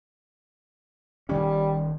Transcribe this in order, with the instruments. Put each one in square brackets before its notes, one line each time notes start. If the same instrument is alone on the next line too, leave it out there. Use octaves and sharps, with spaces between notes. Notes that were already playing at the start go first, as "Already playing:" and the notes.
[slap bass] D#1 D#3 C#4 [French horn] G3